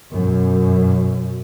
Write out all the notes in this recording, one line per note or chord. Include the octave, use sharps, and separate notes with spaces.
F#2 B2